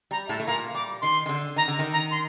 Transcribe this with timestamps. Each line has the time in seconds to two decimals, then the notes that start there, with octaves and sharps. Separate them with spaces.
0.11 G3 A#5
0.29 A2 A3 A5
0.40 A3
0.47 A#2 A#3 A#5
0.74 G3 D6
1.01 D#3 C6
1.26 D#3
1.29 D3
1.56 D#3 A#5
1.68 D3
1.79 D#3
1.93 A#5
2.11 C6